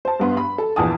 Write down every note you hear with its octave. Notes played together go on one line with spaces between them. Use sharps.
C5 A5
G2 B3 C6
B5
A4
A#1 E2 G#5 A5 D#6